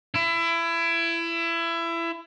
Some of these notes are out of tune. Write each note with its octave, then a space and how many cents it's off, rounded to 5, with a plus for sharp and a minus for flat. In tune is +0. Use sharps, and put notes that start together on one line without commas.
E4 +25